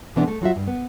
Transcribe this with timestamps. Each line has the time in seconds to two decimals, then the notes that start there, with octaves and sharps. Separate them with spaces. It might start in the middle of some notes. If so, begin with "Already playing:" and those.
0.16 B2 E3 G#3 B3 C4 D4
0.28 A3
0.42 F#3 F4 F#4 E5
0.56 G2
0.68 B3